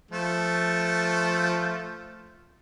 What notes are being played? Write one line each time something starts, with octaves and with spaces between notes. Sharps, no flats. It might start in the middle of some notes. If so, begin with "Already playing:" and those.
F3 A3